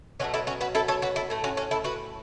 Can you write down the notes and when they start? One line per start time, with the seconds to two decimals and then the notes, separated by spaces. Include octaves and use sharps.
0.19 B2 F#3 A3 C#4 F#4
0.34 E4 A4
0.47 C#4 F#4
0.61 F#4 B4
0.75 E4 A4
0.88 A4 C#5
1.02 F#4 B4
1.16 E4 A4
1.30 A2 A3
1.44 C#4 F#4
1.57 C#4 F#4
1.71 E4 A4
1.84 F#4 B4